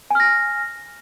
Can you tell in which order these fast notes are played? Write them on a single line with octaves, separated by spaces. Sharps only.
G#5 F6 A#6